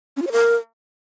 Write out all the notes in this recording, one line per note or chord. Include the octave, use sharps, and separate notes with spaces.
C#4
F4
C#5
A#4